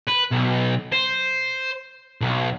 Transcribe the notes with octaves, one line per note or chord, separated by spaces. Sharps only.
B4
B1
C5
B1